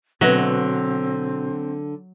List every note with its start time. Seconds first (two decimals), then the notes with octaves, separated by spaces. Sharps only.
0.21 B2 D3 F#3 C4 F#4 B4 D#5